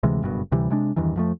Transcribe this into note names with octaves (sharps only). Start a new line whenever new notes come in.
D2 C3 E3 G#3
F#1 G2 B2
D2 C3 E3 G3
C3 G#3 D4
E2 G2 D#3 E3
F2 F3 A3